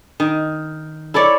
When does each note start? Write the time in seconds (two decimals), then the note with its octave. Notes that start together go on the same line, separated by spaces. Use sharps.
0.20 D#3
1.14 E4 A4 C#5 D5